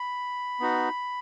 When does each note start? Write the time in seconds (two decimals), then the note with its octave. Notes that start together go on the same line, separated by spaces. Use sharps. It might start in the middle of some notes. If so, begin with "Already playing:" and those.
Already playing: B5
0.60 B3 D#4 F#4